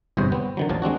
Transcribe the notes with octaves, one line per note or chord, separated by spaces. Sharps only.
G1 E2 G#2 C3 C5 C#5
B3 C4
D3 D#3 F#3
A1 D#2 F3 F5 A5
G#3 C4 D4 F#4